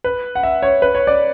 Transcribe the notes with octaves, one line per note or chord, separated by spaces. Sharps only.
B4
F#5
E5
C#5
B4
C#5
D5